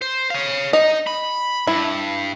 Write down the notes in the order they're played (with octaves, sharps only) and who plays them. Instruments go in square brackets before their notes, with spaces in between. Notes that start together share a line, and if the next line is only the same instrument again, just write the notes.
[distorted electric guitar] C5
C#5 F5
[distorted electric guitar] D#4 [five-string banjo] D#5
[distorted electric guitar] B5
[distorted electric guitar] G2 [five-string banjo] E4